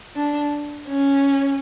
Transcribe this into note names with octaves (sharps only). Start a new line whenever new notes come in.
D4
C#4